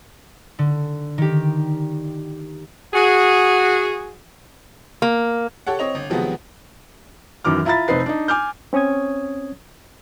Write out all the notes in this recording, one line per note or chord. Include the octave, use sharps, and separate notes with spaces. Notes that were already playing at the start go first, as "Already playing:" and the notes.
D3
D#3 G4
F#4 G#4
A#3
G4 A4 C#5 F#5
C4 C#5 D#5 F7
G1
C3 D#3 F3 F#3 G#3 B3
F#2 D#3 E3 D6 F6
E4 F4 E5 A#5 B5 A6
F1 C4 D#4 B4 C7
D4 D#4
G#5 D6 F6 G6
C4 C#4 C#5 D#6 G#6